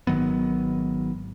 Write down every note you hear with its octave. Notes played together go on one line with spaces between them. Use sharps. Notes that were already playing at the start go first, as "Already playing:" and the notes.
G#1 D#3 F#3 B3